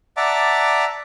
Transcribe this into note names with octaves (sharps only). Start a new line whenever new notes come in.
D5 E5 F#5 A5 A#5 D6